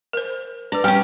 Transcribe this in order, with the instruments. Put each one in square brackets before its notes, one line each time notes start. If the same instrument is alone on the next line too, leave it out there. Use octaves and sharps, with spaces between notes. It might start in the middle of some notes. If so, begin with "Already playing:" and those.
[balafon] A#4 C5
[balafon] D4 B4 [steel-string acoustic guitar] D5
[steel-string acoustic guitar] G3 C#4 [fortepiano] G5 F6